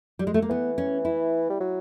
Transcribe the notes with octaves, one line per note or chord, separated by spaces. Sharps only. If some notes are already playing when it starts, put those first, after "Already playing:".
G3
G#3
A3
A#3
E3 B3
C#4
E4
G3
F#3